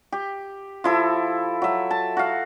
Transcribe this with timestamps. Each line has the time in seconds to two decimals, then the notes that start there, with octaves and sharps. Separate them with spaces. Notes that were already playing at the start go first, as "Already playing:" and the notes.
0.12 G4
0.84 F3 E4 A4
1.62 F#3 E5
1.91 A5
2.17 F#4 F5